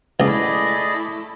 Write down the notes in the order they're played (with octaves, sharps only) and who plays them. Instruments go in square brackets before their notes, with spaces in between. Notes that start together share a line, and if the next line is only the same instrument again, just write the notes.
[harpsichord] C#2 [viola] A3 E4 [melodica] G#4 D5 D#5